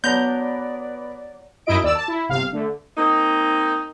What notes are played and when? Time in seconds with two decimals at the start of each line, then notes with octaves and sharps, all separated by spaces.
0.04 F#3 B3 D4 B4 D5 G6 A#6 F7
1.66 F#2 D#4 E4 D#5 D7
1.83 D#2 D5 E6
1.95 A5
2.08 E4
2.29 G1 C3 F5
2.52 D3 A3
2.98 A#3 C4 D#4